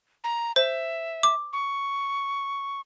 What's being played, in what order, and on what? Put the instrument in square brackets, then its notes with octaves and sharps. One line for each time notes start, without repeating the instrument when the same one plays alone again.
[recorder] A#5
[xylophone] C5 [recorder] E5
[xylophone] D6
[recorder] C#6